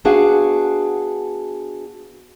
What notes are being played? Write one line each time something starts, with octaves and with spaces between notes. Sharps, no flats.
B3 D4 F#4 G#4 F5 F#5